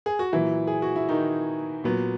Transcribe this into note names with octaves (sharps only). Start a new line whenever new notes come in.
G#4
F#4
A#2 E3 F#3 E4
G#4
F#4
E4
D#3 D#4
A#2 F#3 B3